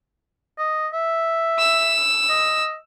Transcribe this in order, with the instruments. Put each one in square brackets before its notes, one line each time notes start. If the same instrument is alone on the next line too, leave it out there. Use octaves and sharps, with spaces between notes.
[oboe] D#5
E5
[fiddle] E6
[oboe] D#5